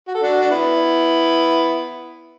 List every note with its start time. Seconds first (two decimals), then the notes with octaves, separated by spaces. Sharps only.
0.08 F#4
0.15 A4
0.23 D4 F#4
0.41 D4
0.51 B3 E4